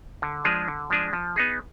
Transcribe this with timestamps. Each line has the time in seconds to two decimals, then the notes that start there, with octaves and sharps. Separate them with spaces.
0.22 D3
0.45 F3 G#3 D4 G#4
0.68 D3
0.90 F3 G#3 D4 G#4
1.13 F3
1.36 B3 D#4 G#4